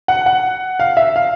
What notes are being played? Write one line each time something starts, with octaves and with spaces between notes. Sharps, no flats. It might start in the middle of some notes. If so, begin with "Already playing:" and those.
F#5
F#5
F5
E5
F5